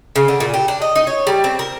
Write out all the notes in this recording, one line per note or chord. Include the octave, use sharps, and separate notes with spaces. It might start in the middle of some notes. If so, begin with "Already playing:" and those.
C#3
D3
A#2
G4
D4
D#5
D#4
C#5
G3
C4
A#4